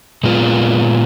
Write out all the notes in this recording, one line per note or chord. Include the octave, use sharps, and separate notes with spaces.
A#2 G#3 B3 F4